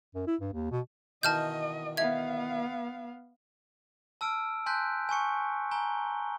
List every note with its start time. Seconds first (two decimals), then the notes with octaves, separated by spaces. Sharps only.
0.15 F#2
0.27 E4
0.41 G2
0.54 D#2
0.71 B2
1.23 B2 D#3 E3 D#5 A5 F6 G6
1.97 B3 E5 F5 G#6
4.21 A5 E6 F6 D7
4.66 G#5 A5 C6 F#6 G6 B6
5.09 G#5 A5 C#6 C#7
5.71 G#5 A#5 G7